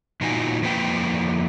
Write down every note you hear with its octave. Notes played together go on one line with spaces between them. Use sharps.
A#2 E3 D#4 F4 F#4 G#5
F2 E3 A#3 B4 G5